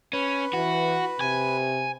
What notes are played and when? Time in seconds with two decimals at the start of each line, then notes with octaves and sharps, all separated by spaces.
0.13 C#4 B4
0.53 E3 F#4
1.21 C3 G#5